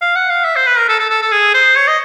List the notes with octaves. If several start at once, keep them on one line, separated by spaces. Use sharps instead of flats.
F5
F#5
F5
E5
C5
B4
A#4
A4
A4
A4
A4
G#4
C5
C#5
D#5